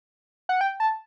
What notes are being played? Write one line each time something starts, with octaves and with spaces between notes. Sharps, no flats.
F#5
G5
A5